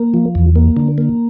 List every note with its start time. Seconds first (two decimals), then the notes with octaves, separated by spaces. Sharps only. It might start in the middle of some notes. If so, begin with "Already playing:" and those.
Already playing: A#3
0.14 F3
0.35 E2
0.56 A#3
0.77 D3
0.98 A#3